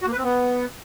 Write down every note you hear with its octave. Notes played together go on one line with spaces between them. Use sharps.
F#4
A#3
B4
C4
B3